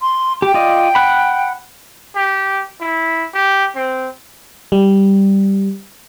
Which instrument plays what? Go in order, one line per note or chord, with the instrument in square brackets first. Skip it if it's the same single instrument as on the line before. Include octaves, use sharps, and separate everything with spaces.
[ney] C6
[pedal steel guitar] G4 [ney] G5
[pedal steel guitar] F4 D5 D#5
F#5 B5
[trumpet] G4
E4
G4
C4
[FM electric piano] G3